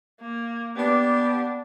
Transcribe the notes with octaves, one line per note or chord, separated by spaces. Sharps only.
A#3
B3 D4 G4